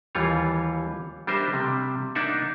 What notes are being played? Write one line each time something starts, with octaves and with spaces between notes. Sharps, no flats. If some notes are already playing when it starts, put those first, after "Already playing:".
D#2 E3 G3 F4 C#5 F5
G3 D4 A#4 C5 D#5 E5
C3 G3
A#3 D4 D#4 D5 E5 F#5